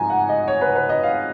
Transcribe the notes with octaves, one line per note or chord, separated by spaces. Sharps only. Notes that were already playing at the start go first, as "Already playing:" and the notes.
Already playing: G#2 F3 G#3 G#5 A#5
F#5
D#5
C#5
B4
B4
D#5
F5